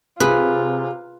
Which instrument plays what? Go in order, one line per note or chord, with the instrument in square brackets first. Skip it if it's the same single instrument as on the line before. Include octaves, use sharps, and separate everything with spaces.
[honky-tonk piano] C3 [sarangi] F4 [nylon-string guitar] G#4 [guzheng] B4